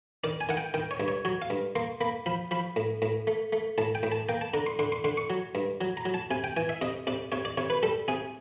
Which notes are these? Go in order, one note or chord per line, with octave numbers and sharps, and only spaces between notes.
D#3 D5
G#5
D#3 F#5
G5
D#3 G5
C#5
G2
C#5
F#3 C#5
F5
G2
A#3 C6
A#3 B5
F3 B5
F3 B5
A2
A2
A3
A3
A2 A5
G5
A2
A5
A#3 G5
A5
D3 A#5
C6
D3 C6
C6
D3 C6
C#6
F#3
G2
F#3
A#5
F#3
A5
C3 G#5
G5
E3 G#5
E5
C3 D#5
C3 D5
C3 C#5
D5
C3 C#5
B4
G3 A4
C3 G#4